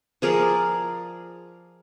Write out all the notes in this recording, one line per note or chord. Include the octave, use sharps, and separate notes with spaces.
F3 G#4 A#4 D5